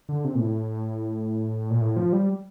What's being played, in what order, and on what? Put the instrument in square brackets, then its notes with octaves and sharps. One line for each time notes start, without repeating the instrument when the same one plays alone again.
[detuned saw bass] D3
C3
A#2
A2
A#2
A2
F3
G3